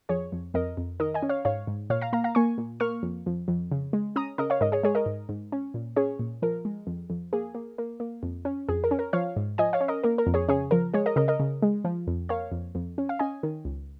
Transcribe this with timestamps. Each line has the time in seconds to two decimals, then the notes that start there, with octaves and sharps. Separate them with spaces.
0.09 F2 G#4 C#5
0.32 F2
0.54 F2 A#4 D#5
0.77 F2
1.00 D#3 A#4 D#5
1.14 D#5 G#5
1.23 C#4
1.29 C#5 F5
1.45 G#2 C#5 F5
1.67 G#2
1.90 A#2 C#5 F5
2.01 F5 A#5
2.13 A#3 F5 A#5
2.24 F5 A#5
2.35 A#3 G#5 C#6
2.58 A#2
2.80 A#3 C#6 F6
3.03 F2
3.26 F2
3.48 F2
3.71 C#3
3.93 G#3
4.16 C#4 A#5 D#6
4.38 C#3 A#4 D#5
4.50 C#5 F5
4.61 G#2 A#4 D#5
4.72 G#4 C#5
4.83 G#3 G#4 C#5
4.95 A#4 D#5
5.06 G#2
5.29 G#2
5.52 C#4
5.74 A#2
5.96 C#4 G#4 C#5
6.19 A#2
6.42 F3 A#4
6.65 G#3
6.87 F2
7.10 F2
7.33 A#3 G#4
7.55 A#3
7.78 A#3
8.00 A#3
8.23 F2
8.45 C#4
8.69 F2 G#4
8.84 A#4
8.91 C#4
8.99 A#4
9.13 F3 C#5 F5
9.36 G#2
9.58 F3 D#5 G#5
9.73 C#5 F5
9.81 C#4
9.88 A#4 D#5
10.03 A#3 A#4
10.18 A#4
10.27 F2
10.34 G#4 C#5
10.48 C#3 G#4 C#5
10.71 F3 A#4
10.94 G#3 G#4 C#5
11.06 A#4 D#5
11.16 C#3 A#4 D#5
11.28 A#4 D#5
11.40 C#3
11.62 G#3
11.85 F3
12.07 F2
12.29 A#3 C#5 F5
12.52 F2
12.75 F2
12.98 C#4
13.09 F5
13.19 C#4 D#5 G#5
13.43 D#3
13.65 C#2